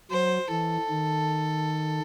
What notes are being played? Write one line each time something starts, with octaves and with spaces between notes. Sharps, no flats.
F#3 C5
E3 A4
D#3